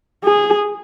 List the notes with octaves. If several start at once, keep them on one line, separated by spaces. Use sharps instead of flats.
G#4